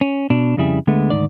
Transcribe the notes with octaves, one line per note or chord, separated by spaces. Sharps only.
C#4
B2 D4
F2 C#3 G3 E4 G#4
D2 D3 G#3 A3 B3
D2 G#2 D#3 D5